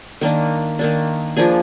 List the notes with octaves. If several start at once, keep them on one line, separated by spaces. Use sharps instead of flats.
D#3 A#3 D4
D#3 A#3 D4
F3 A#3 D4 G#4